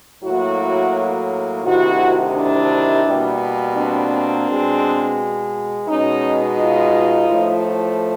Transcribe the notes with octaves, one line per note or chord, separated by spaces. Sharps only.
A2 F#3 A#3 E4 F#4
D2 C3 D#3 E4 F#4
D4 E4
B2 G3 A#3
C4 D4
B2 G#3
B2 G#3 C#4 D#4
D#4 F4
A2 F3 A3